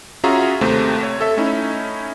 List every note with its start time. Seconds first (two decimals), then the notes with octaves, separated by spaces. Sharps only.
0.24 C#4 F4 F#4 G#4 E5 A#5
0.61 D#2 C3 A3 C5
1.03 C#5
1.21 A4 E5
1.37 A3 C#4 D#4 E4